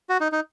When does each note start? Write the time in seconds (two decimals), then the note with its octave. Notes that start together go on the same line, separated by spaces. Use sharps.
0.09 F#4
0.20 D#4
0.32 D#4